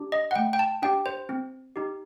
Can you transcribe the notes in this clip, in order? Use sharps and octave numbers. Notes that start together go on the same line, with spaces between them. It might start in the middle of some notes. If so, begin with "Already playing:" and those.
Already playing: D4 G4
D#5
F#5
A3 G5
G5
A5
D4 G4 G5
C5
C4
D#4 G4